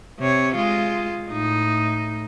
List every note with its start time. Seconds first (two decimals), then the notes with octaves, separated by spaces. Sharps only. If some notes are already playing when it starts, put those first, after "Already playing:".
0.19 C3 C#5
0.55 G#3 F4
1.30 A2 D#4